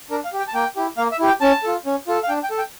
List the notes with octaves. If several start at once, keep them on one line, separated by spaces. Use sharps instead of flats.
D4 A#4
F5
G4
G5
A5
A#3 G5
E4 G4
A#3 F5
E5
E4 G4
G5
C#4 A5
F4 A4
C#4
F4 A4
F5
D4 G5
G5
A4
G5